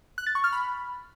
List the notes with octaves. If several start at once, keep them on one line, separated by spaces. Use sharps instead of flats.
F#6
A6
C#6
F6
B5